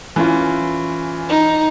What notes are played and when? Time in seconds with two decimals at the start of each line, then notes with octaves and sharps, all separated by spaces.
0.16 E3 C#4 F4
1.29 D#4